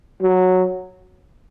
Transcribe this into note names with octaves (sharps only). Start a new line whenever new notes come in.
F#3